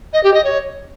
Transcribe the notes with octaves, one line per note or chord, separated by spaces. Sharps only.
D#5
G4
D#5
C#5